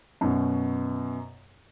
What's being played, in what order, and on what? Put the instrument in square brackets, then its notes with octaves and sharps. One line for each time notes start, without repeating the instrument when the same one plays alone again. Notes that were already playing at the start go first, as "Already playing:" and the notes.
[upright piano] F#2 B2